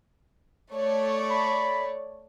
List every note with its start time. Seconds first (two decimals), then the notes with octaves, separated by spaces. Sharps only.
0.73 A3 C#5 D5
1.30 B5